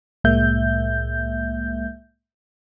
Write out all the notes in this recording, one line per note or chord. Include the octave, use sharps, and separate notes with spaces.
C2 A2 G#3 A#3 E5 G6